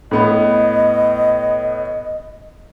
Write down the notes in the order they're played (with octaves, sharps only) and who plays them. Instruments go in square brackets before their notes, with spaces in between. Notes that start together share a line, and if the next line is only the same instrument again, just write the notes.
[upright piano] A2 B3 B4 [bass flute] D#5